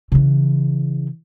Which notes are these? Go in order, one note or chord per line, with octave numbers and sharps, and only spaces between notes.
C#3 E3